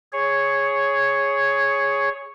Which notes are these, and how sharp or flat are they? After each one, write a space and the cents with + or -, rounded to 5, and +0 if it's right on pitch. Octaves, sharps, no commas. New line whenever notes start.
G#4 +0 C#5 +0